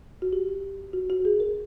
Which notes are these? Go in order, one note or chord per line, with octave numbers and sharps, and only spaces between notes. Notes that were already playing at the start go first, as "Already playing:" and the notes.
F#4
G4
F#4
F#4
G#4
A#4